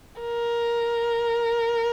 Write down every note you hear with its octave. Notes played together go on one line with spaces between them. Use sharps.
A#4